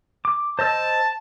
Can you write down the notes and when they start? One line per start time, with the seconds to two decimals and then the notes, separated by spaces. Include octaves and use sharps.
0.25 D6
0.59 C5 D#5 A5 E6